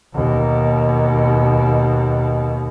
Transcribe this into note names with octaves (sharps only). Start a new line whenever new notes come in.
D#2 B2